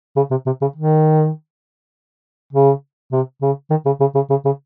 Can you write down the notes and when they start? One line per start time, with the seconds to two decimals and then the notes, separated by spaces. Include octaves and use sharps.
0.16 C#3
0.31 C3
0.46 C3
0.61 C#3
0.76 D#3
2.53 C#3
3.12 C3
3.42 C#3
3.70 D#3
3.86 C#3
4.00 C#3
4.15 C#3
4.30 C#3
4.45 C#3